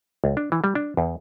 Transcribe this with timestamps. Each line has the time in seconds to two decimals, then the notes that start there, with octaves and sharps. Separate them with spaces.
0.24 C#2
0.37 D4
0.52 E3
0.64 G3
0.75 D4
0.97 E2